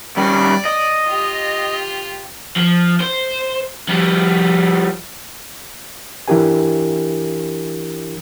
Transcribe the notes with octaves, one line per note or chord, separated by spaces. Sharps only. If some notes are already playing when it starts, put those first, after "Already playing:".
G3 C#4 D5
D#5
F4 G4
F3
C5
F3 G3
E3 D4 E4 G4 A#4 G#5